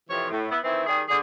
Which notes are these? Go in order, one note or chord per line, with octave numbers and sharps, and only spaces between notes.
F2 C3 E3 F3 C#5
A2
B3 E4
D#3 E3 C4 E4
D#3 G3 G#4
D3 G#4